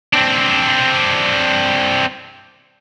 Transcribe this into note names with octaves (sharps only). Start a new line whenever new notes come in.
C4 D4